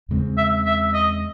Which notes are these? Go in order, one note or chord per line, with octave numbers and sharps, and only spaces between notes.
E2 C#3 G#3 C4
E5
E5
D#5